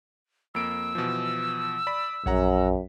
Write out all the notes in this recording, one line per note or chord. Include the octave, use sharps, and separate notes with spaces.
F2 A#3 E6 D7
B2 E3 F3
D5 B5 B6
A#1 F#2 C#5 F#5 A#5